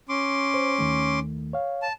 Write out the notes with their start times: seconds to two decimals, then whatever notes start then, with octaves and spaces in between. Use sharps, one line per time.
0.09 C#4 C6 D6
0.54 C5
0.79 D#2 D#3 A3
1.53 C#5 F5
1.82 A5